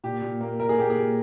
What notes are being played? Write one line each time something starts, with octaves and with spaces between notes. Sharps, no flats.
A#2 G4
A#2
A#3
A#2 A#4
G#4
A#3 G4
G#4
A#2